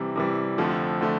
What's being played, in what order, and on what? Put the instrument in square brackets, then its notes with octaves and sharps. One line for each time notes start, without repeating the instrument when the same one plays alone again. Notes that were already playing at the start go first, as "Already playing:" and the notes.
Already playing: [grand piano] C3 E3 G3
C3 E3 G3
F2 D3 F3 A3
D3 F3 A3